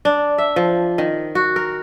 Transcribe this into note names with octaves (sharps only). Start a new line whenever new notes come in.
D4
E5
F3
D#3
F#4
A#4